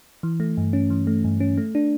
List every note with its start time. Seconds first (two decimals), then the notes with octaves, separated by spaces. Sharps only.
0.23 E3
0.40 A3
0.57 G2
0.73 C#4
0.90 E3
1.07 A3
1.24 G2
1.40 C#4
1.57 A3
1.75 D4